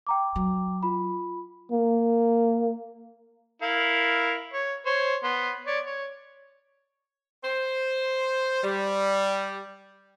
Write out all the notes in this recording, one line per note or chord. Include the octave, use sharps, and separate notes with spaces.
G5 A#5 D6
F#3
F4 B5
A#3
E4 A#4 F5
C#5
C5 C#5
B3 C6
C#5 D5
C#5
C5
G3